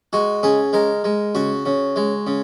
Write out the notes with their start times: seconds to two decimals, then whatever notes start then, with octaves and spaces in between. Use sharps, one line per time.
0.13 G#3 F#4
0.43 C#3 G#4
0.73 G#3 A#4
1.04 G#3
1.35 C#3 F#4
1.66 C#3
1.96 G#3
2.27 C#3